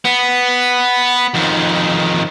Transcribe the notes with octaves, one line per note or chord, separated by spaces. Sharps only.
B3
F2 D#3